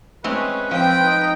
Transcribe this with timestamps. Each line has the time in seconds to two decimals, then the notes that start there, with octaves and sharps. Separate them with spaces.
0.24 G#3 A3 C4 C#4 B4
0.71 F3 C4 G5
1.03 D#4